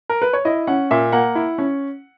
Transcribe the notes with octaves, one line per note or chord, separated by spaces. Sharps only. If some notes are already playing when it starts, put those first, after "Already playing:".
A#4
B4
C#5
E4 D#5
C#4 F#5
A#2 E5
A#3 F#5
E4
C#4